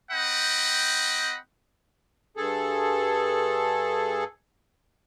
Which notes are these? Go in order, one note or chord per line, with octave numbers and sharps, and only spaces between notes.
C4 D#5 F#5 G5 B5
G2 G#4 A4